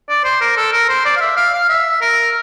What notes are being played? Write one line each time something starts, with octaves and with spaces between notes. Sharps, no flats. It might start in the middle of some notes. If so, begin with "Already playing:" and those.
D5
C5
A#4
A4
A#4
C5
D5
F5
E5
F5
F5
E5
A#4